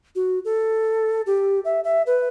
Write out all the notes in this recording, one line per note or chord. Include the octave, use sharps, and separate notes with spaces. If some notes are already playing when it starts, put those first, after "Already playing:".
F#4
A4
G4
E5
E5
B4